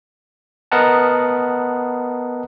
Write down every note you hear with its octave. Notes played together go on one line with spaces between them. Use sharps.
B3 A#4 D#5 F#5 A5